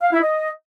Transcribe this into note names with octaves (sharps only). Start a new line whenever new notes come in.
F5
E4
D#5